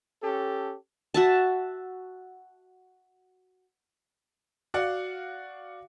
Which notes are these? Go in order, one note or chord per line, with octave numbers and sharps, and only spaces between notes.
C#4 G4 A4
F#4 E5 A5
F#4 D5 F5 F#5